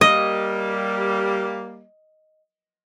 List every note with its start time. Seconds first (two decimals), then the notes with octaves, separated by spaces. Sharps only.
0.01 G3 A#3 D#5